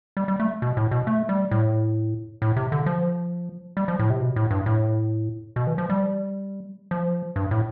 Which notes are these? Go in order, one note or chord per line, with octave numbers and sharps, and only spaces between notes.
G3
G3
A3
B2
A2
B2
A3
G3
A2
A2
C3
D3
F3
G3
F3
A2
C3
B2
A2
G2
A2
B2
E3
F3
G3
F3
G2
A2